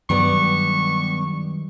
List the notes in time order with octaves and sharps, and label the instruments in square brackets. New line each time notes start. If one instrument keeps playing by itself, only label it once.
[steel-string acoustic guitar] G2 B3 D5 [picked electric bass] D#3 F#3 G3 [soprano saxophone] C#6